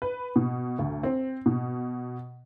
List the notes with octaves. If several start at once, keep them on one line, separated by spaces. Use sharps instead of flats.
B4
B2
D2
C4
B2